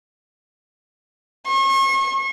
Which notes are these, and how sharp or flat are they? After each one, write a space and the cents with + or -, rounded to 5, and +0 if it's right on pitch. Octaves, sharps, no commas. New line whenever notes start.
C#6 -40